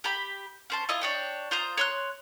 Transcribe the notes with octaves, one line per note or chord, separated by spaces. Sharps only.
G4 B5
C#4 C5 A5
E4 F4 D#5
D4 C#5 G5
F4 C5 A#5 D#6
C#5 C6 F#6